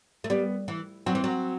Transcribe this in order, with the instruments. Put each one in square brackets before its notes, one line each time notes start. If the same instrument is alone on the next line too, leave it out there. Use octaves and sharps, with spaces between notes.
[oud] A3
[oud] G3 [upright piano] B3
[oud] E3
[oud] F#3 [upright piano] C4
[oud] E3
F#3